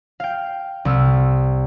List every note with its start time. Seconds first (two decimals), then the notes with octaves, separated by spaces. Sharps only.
0.20 F5 G5
0.85 C2 E6 F6